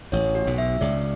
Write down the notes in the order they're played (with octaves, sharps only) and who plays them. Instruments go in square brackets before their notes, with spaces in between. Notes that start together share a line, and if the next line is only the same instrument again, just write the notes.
[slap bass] A1 A2 [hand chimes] C#5
[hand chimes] F#4
[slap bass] B1 B2
[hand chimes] E5
[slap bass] C#2 C#3 [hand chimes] D5